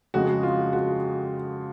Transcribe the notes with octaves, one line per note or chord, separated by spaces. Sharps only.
F2 C#3 G#3 F#4
F4
F#4